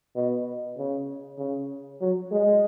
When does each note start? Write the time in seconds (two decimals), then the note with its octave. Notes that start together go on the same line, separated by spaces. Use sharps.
0.16 B2
0.78 C#3
1.39 C#3
2.01 F#3
2.32 G#3